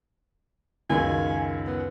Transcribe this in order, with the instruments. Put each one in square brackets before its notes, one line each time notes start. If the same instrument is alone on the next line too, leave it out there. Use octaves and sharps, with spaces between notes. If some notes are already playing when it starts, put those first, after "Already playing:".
[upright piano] C#2 F#2 D#3 [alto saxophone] G#5
[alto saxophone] B3